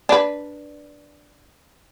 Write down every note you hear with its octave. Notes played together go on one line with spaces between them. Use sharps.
D4 B4